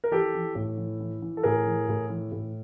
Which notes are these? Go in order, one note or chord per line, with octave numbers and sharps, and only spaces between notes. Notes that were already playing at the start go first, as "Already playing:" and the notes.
A#4
E3 G4 A4
E3
A2
E3
E3
E3
A4
A2 G#4 A#4
E3
A2
E3
A2